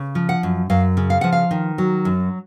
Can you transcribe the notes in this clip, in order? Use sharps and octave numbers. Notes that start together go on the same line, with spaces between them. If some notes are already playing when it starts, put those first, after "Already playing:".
Already playing: C#3
F3
F#5
F#2
F#2 F5
C#3
F5
F3 F#5
F5
D#3
F#3
F#2